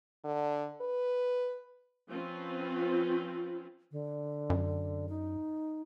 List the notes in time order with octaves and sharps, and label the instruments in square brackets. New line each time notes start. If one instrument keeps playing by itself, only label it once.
[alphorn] D3
B4
[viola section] F3 C4 C#4 F4 B4
[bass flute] D3
[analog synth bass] F#2
[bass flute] D#4